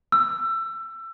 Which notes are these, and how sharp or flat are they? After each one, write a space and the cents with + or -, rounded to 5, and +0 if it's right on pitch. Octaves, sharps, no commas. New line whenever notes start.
E6 +25